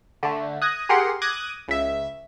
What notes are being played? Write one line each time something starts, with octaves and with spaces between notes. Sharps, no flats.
D3 A3
D#6 F#6 G#6 A#6
G4 G#4 A#4 F#5 C6
D6 D#6 F#6 G#6 A#6 D#7
C#2 E5